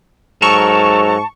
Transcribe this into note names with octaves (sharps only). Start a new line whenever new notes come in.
G#2 F#3 A4 A#4 A5 C#6